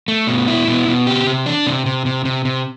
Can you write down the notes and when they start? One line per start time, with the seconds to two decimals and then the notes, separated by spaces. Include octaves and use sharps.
0.08 A3
0.27 B2
0.48 E4
0.68 B2
0.88 B2
1.07 G4
1.27 C3
1.46 D4
1.67 C3
1.86 C3
2.06 C3
2.25 C3
2.45 C3